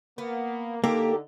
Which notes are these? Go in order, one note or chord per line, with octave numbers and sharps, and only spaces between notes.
A#3 B3
D3 A#3 D#4 G4 A4 A#4